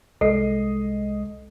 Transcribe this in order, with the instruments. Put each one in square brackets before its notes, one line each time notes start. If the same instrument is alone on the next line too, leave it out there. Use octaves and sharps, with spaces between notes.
[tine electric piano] C2 G#3 C7 [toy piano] A4 [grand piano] D#5